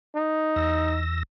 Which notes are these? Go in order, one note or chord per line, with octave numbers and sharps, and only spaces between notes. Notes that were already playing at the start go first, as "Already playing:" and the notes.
D#4
E2 E6 A#6